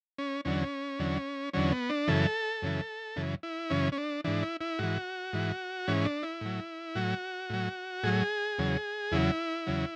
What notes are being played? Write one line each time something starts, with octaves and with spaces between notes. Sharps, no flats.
C#4
E2 D3 F#3 C#4
E2 D3 F#3
E2 D3 F#3 C#4
B3
D4
F#2 C#3 E3 A4
F#2 C#3 E3
F#2 C#3 E3
E4
F#2 C#3 E3 C#4
C#4
D4
G#2 E3 D4
E4
E4
G#2 E3 F#4
G#2 E3
G#2 E3 C#4
D4
E4
A2 F#3
A2 F#3 F#4
A2 F#3
A2 F#3 G#4
E2 C#3 F#3
E2 C#3 F#3 E4
E2 C#3 F#3